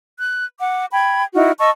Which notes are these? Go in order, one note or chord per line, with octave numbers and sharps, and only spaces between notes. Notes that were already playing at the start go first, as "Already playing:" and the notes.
F#6
F#5 D6
G5 B5 G#6
D#4 E4 F#4 F6
D#5 A5 C#6 E6